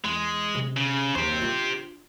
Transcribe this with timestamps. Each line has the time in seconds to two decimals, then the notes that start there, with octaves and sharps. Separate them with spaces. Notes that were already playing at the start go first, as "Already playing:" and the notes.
0.04 E2 G#3
0.55 C3 C#4
0.77 C#3
1.15 F#1 D#2 G4 C5
1.42 D4 F4